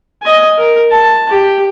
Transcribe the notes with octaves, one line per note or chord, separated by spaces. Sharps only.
D#5 G#5
A#4
A5
G4